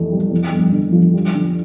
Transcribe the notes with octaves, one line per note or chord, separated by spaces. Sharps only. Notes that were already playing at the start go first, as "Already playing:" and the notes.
Already playing: F1 F2 E3 A3
G3
F2
G1
D3
F3
G3
D3